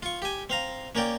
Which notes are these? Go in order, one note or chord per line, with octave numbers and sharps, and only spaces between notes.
F4 C#6
G4 G#5
C4 F5 A#5
A#3 C#4 A#4 D5 G5